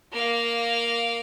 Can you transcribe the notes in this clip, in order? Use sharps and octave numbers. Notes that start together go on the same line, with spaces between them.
A#3 F5